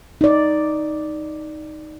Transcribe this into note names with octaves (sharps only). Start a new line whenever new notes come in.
D#4 D5